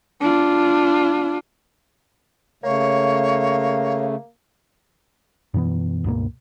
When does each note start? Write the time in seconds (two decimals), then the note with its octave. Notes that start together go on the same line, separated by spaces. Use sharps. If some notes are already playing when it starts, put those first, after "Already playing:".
0.22 D4 F4
2.64 C#3 A3 A#3 C#5
5.54 F#2 B2 E3 B3
6.04 C#2 G2 B2 A#3